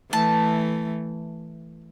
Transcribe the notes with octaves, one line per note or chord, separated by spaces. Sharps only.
E3 A3 A5